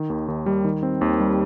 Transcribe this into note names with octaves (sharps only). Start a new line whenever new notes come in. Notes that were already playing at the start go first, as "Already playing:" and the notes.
Already playing: D#3
D#2
D#2
G3
D#3
C4
D#2
G3